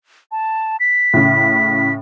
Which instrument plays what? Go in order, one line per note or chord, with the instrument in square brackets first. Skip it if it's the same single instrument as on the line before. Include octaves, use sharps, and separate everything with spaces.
[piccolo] A5
B6
[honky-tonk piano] A2 C#3